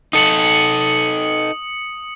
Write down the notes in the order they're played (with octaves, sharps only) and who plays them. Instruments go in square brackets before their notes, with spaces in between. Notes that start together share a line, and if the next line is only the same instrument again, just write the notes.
[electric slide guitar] D#4 A4 [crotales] D#6 C#7 F#7